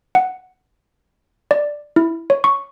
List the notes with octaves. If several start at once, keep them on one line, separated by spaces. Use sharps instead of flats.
F#5
D5
E4
C#5
C#6